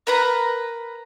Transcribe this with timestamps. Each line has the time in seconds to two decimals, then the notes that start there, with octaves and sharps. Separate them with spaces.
0.07 A#4 B4 A#5